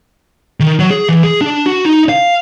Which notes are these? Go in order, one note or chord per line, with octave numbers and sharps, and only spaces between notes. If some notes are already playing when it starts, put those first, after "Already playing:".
D#3
F#3
G#4
E3
G#4
D4
F#4
D#4
F5